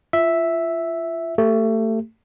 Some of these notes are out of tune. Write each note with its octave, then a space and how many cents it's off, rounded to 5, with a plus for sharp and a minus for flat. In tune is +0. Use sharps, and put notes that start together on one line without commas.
F4 -25 E5 +0
A3 +25 G4 +20